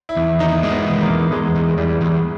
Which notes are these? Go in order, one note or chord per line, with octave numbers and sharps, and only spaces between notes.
E4
E2
D#3 D#4
G#3
B3
E2
A#3
E2
E2 G#3
E2
E2 G3
E2